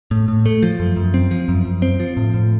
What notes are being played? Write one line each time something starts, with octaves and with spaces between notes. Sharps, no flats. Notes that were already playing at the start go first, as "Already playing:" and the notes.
A2
A2
A3
F3
F#2
F#2
C4
F3
F#2
F#2
C4
F3
A2
A2